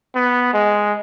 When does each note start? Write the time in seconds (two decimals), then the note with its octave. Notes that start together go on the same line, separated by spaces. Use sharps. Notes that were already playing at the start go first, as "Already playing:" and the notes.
0.15 B3
0.54 G#3